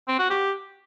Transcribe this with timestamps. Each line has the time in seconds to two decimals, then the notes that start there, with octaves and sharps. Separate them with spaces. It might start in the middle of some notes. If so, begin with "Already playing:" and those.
0.08 C4
0.19 F#4
0.30 G4